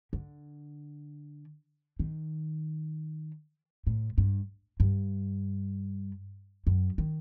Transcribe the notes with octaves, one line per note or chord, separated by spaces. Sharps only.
D3
D#3
A2
G2
G2
F#2
D#3